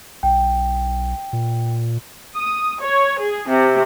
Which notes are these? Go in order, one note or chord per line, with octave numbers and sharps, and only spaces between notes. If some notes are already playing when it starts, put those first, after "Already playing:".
B1 G5
A#2
D#6
C#5
G#4
C3